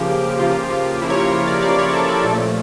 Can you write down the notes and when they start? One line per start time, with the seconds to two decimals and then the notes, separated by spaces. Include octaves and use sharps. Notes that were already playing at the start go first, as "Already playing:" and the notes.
Already playing: C#3 F3 A#3 G4
0.39 C#3 F3 A#3 F4
0.70 F4
1.02 C#3 F3 A#3 E4
1.10 C#5
1.17 A#4
1.32 C#5
1.47 D5
1.62 C#3 F3 A#3 D5
1.79 C#5
1.94 A4
2.09 A4
2.24 A#2 F3 A3